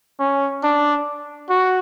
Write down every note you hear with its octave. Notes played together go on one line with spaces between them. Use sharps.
C#4
D4
F#4